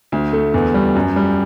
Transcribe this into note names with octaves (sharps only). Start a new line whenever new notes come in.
D2
A3
E2
G3
F#2
G3